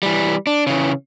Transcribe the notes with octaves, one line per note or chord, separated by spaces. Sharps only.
E3 G3
D4
C#3 E3